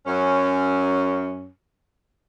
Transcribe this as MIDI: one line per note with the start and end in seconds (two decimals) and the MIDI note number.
0.06 1.50 42
0.06 1.50 61